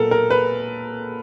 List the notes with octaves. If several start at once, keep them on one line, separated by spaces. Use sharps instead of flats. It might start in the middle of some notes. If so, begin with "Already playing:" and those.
Already playing: A#2 F#3 B3 A4 A#4
A#4
B4